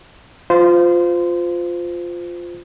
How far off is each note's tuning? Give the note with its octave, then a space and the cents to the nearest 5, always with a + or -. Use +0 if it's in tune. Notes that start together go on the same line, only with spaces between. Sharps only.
F4 +5 C5 -25